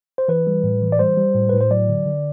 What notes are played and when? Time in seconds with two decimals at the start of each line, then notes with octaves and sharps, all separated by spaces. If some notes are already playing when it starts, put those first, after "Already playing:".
0.18 C5
0.28 E3 B4
0.47 G3
0.64 A2
0.82 E3
0.92 D5
0.99 G3 C5
1.17 G3
1.34 A2
1.49 A2 B4
1.61 C5
1.70 F#3 D5
1.89 D3
2.06 D3